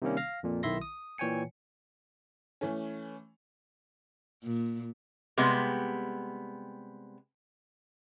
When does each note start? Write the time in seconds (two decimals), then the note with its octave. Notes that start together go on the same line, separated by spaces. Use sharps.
0.02 C3 D#3 G3 A#3 C#4
0.17 F5 F6 A#6
0.43 F2 A#2
0.63 B1 D#3 E4 E5 C6 A#6
0.81 D#6
1.18 A#2 E3 C#5 G5 G#5 C#7
2.61 E3 A3 C#4
4.44 A#2
5.37 C3 G3 G#3 B3